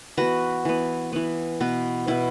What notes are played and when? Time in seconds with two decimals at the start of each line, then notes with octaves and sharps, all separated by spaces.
0.17 E3 B3 F#4 B4
0.65 E3 B3
1.12 E3 B3
1.60 B2 B3
2.07 B2 B3 E4